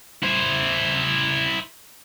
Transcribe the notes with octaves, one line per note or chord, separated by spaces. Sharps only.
E4 C5